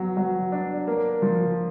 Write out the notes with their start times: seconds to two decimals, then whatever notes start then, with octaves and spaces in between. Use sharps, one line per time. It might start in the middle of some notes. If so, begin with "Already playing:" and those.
Already playing: F#3 B3
0.17 F#3
0.52 D4
0.87 A#3
1.22 F3